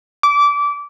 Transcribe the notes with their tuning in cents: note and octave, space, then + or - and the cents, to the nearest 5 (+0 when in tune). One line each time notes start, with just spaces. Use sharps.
D6 -20